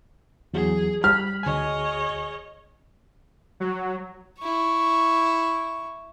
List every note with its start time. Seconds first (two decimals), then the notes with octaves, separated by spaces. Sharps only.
0.53 E2 F#3 G#4
1.04 G3 B5 F6
1.43 D2 G#4 C#5 D#5 G#5
3.60 F#3
4.40 E4 C#6